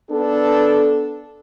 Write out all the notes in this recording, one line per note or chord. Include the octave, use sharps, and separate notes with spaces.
B3 D4 A4